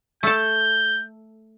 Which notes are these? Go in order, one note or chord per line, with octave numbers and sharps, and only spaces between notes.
A3 A4 G6